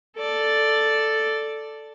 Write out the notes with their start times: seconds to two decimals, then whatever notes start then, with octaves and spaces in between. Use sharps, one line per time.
0.17 A4 D5